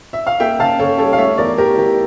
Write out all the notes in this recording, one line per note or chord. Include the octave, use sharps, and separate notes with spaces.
E5
F5
A#3 E5 G5
C#3 F5 A5
C#3 A4 C#5
G3 A4 C#5
F5
A3 C#5 E5
E2 A#4 D5
E2 G4 A#4
E3 G4 A#4